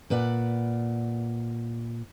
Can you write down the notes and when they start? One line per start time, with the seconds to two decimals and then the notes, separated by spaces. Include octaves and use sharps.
0.10 A#2 B4 D5 F#5